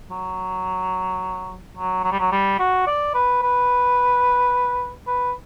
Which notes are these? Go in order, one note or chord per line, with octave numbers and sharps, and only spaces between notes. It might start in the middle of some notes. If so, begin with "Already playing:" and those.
F#3
F#3
F#3
G3
F#3
G3
F#4
D5
B4
B4
B4